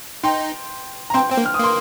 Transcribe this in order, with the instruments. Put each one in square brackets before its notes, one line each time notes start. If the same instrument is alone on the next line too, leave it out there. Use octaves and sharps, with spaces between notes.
[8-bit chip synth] D#4 [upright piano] G5 C6
[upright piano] A#5
[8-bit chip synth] C4 [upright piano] G5 C6
[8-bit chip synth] C4 [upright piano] G5
[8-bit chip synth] A#3
[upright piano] F6
D#6
[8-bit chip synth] A#3 [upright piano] C6